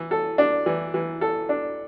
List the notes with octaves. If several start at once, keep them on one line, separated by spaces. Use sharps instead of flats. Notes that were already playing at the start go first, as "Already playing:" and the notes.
Already playing: E3
A4
D4
E3
E3
A4
D4